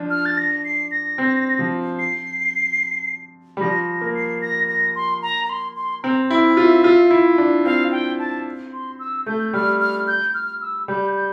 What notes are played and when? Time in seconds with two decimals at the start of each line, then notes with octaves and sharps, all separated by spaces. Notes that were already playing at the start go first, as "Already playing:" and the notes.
Already playing: F3 D4
0.10 F6
0.26 A6
0.37 A#6
0.65 C7
0.91 A#6
1.18 C4
1.59 F3
1.99 C7
3.57 G3
3.61 F3 A#6
3.88 A#6
4.01 A#3
4.15 C7
4.41 A#6
4.68 A#6
4.95 C6
5.22 A#5
5.45 A#5
5.50 C6
5.76 C6
6.03 C4 A#5
6.30 E4 G5
6.57 F4 E5
6.84 F4
7.11 E4
7.38 D4
7.65 C4 F5
7.92 G5
8.19 A5
8.73 C6
8.99 E6
9.26 A3 G6
9.53 G3 F6
9.81 F6
10.07 G6
10.34 F6
10.61 E6
10.88 G3 G6
11.15 G6